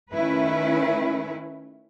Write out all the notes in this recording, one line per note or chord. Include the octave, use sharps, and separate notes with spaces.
D#3 A3 C#4 E4 B4